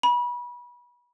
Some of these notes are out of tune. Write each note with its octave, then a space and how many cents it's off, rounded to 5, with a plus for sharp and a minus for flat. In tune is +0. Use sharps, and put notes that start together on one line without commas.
B5 -30